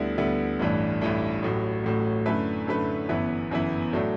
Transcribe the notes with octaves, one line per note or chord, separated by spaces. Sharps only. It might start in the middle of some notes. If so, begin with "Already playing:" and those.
Already playing: D2 D3 G3 B3 E4
D2 D3 G3 B3 E4
A1 G2 E3 A3 D4
A1 G2 E3 A3 D4
A1 A2 F#3
A1 A2 F#3
F#2 D3 A3 E4 B4
F#2 D3 A3 E4 B4
G1 F#2 E3 B3 E4
G1 F#2 E3 B3 E4
A2 F#3 A3 D4